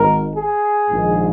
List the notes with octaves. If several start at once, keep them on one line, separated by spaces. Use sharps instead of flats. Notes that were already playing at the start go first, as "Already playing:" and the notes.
Already playing: G#1 G#2 D#3 A#4
G#4
A#1 G#2 D#3